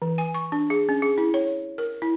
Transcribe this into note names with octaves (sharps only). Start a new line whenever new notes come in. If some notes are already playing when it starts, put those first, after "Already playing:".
E3
G#5
C#6
D4
G#4
C#4
G#4
E4
C#5
A#4
E4